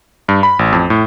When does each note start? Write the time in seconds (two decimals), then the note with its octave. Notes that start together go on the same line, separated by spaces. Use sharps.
0.28 G2
0.43 B5
0.59 A1
0.72 F2
0.90 A2